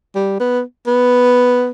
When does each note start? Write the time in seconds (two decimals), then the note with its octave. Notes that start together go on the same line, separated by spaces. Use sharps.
0.15 G3
0.40 B3
0.87 B3